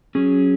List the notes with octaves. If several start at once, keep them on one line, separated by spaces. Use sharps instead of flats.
F#3 C#4 G#4